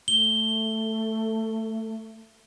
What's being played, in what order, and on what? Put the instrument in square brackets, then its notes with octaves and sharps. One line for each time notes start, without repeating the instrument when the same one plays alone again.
[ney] A3 [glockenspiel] G7